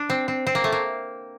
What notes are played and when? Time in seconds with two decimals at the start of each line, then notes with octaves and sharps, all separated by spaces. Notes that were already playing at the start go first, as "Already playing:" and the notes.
Already playing: D4
0.10 C4
0.28 C4
0.47 C4
0.55 A#3
0.64 A3
0.72 A#3